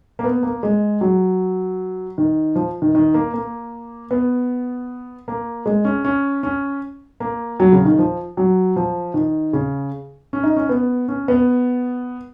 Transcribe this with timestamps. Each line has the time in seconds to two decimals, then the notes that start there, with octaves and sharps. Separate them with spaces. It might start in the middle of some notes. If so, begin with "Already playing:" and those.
0.19 A#3
0.24 B3
0.43 A#3
0.63 G#3
1.01 F#3
2.18 D#3
2.55 F3
2.82 D#3
2.95 D#3
3.14 A#3
3.34 A#3
4.11 B3
5.28 A#3
5.66 G#3
5.85 C#4
6.05 C#4
6.43 C#4
7.20 A#3
7.60 F#3
7.72 C#3
7.85 D#3
7.99 F3
8.37 F#3
8.76 F3
9.14 D#3
9.53 C#3
10.33 C#4
10.44 D#4
10.56 C#4
10.69 B3
11.08 C#4
11.28 B3